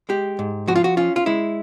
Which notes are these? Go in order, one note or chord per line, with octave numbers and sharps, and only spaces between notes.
G#3 G4
G#2
F3 F#4
F4
F#4
C#4 F4
F4
G#3 E4